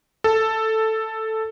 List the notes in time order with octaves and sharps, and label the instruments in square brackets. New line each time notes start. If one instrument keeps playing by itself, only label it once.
[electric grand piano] A4